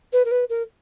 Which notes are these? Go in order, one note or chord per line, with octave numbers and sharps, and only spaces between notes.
B4
A#4
B4
A#4